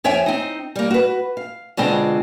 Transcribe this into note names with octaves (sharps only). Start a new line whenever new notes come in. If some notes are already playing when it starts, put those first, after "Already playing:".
F2 C#5 E5 G5 G#5
C4 D#4
G3 A#3
F#4 B4
F5
B2 D3 G#3 C4 D4 F4